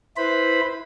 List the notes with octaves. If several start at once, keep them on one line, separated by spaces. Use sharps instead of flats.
E4 B4 C5 B5